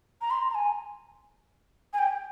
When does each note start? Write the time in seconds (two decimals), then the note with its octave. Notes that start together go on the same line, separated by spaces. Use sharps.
0.21 A#5
0.30 C6
0.50 A#5
0.55 G#5
1.93 G#5
1.98 G5